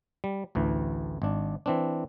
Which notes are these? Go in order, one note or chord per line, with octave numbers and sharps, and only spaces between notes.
G3
A1 D2 E3
G#1 D4
E3 C4 D4